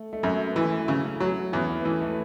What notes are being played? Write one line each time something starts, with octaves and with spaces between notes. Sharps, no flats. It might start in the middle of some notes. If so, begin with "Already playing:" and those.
Already playing: A3
A3
F#2 F#3
B3
E3 A3
C#3 F#3
A3
E4
F#3 C#4 F#4
E2 C#4 F#4
B3 E4
B3
E3 A3 C#4
A3